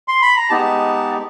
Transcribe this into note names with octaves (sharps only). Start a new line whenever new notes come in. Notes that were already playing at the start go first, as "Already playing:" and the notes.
C6
B5
A#5
G#3 B3 D#4 G4 A5